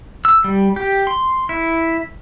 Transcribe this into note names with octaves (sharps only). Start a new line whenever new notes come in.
E6
G3
G4
C6
E4